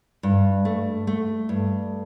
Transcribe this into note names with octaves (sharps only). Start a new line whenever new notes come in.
G2
A3
A3
G2